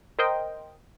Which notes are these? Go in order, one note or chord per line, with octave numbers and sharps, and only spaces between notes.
A#4 C5 D#5 G5